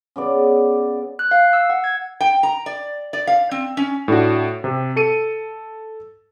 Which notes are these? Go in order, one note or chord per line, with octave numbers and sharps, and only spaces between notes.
C#3 B3 D5
F#6
F5
E6
F#5
G#6
G5
A#5
D5
D5
F5
C4
C#4
A2 D4 F#4
C3
A4 C#7 D#7